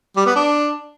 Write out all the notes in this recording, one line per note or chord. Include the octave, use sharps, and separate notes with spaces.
G3
B3
D4